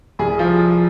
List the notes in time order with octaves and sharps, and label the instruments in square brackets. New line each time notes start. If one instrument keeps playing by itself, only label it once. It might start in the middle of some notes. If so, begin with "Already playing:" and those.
[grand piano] C2 G#4
F3